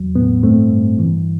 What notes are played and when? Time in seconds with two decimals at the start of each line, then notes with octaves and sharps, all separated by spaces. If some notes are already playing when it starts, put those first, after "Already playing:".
Already playing: E2 F#3
0.15 A2 B3
0.43 G2 A3 C4
0.71 G2
0.99 E3